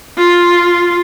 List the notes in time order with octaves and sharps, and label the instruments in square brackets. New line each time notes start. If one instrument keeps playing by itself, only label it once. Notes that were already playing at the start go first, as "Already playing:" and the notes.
[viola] F4